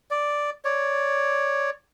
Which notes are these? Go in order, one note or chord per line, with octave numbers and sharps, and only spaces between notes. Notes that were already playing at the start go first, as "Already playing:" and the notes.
D5
C#5 D5